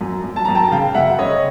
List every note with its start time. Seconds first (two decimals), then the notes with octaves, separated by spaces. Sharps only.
0.01 F#2
0.24 F#2
0.36 A5
0.45 F#2 A#5
0.55 G5 A5
0.72 C#3 F5 G5
0.94 F#2 E5 F#5
1.18 C#3 C#5 D#5